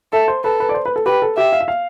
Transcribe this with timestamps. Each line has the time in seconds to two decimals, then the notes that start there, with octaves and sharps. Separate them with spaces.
0.12 A4 E5
0.28 C5
0.44 A4 B4
0.60 B4
0.69 D5
0.74 C5
0.85 B4
0.96 A4
1.06 G4 B4
1.22 A4
1.37 G4 E5
1.53 F5
1.61 E5
1.68 F5